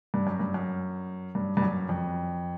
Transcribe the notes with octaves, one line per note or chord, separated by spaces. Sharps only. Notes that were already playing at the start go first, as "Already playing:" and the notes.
G2
F#2
G2
F#2
G2
G2
F#2
F2